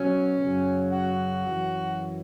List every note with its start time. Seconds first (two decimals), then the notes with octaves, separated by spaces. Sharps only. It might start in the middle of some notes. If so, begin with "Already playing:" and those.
Already playing: B2 F#3 C#4
0.38 F#2 C#3 F#3
0.91 F#4
1.44 F#2 E3